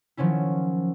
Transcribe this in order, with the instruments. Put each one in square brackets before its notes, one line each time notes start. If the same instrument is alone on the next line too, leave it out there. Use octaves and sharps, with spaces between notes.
[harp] D#3 F3 F#3 C#4 E4